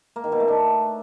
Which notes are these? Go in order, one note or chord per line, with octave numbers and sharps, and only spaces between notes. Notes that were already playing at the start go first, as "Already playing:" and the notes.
A#3
D#3
B2
A3
D4